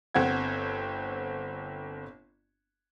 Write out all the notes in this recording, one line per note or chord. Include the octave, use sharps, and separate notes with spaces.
G1 C4 F#5 G#6